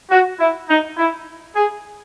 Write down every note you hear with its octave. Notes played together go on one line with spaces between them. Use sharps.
F#4
E4
D#4
E4
G#4